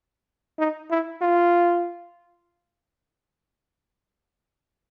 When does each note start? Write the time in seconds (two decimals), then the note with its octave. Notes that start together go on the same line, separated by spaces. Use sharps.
0.59 D#4
0.91 E4
1.22 F4